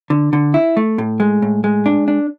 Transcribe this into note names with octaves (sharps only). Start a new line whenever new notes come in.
D3
D3
E4
A3
A2
G#3
A2
G#3
D4
D4